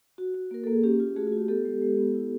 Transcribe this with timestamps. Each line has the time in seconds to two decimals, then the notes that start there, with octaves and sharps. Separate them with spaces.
0.18 F#4
0.34 F#4
0.51 A#3 A#4
0.64 A#3 A4
0.73 G#4
0.83 C#4 G4
1.00 F4
1.16 A3 F#4 G#4
1.27 F#4
1.32 F4
1.37 G4
1.48 B3 G4 A4
1.65 G#3
1.82 G#3
1.98 B3
2.15 E4